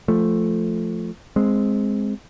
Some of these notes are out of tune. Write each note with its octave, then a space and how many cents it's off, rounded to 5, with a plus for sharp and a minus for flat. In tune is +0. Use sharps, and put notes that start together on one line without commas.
F3 +0 A3 +0
G#3 +0 C4 +0